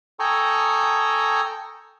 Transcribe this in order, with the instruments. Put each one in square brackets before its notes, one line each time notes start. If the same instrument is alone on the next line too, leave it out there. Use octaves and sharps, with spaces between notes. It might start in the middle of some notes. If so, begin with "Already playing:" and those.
[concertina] A4 G5 G#5 A#5 C#6 D#6